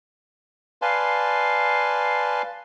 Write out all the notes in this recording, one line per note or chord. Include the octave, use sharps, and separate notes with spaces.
B4 D5 F5 G#5 A5 C6